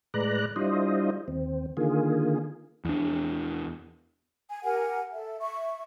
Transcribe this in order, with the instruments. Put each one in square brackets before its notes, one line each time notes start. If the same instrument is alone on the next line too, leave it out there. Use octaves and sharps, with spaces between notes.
[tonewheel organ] A2 G#3 B4 D5 A#5 F#6
G3 D4 E4 F4 C5 D#5
D#2 C4
D3 D#3 A#3 F4 G#4
[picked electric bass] E2 D4
[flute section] G#5
G4 A#4 F#5 G#5
A4 E5
E5 C#6